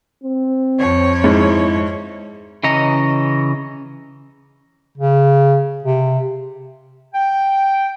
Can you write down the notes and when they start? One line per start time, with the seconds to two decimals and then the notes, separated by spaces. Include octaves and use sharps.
0.24 C4
0.78 F2 C#5
1.24 G#2 E4
2.63 C#3 E3 C#4 D#5 A#5
4.97 C#3
5.84 C3
7.15 G5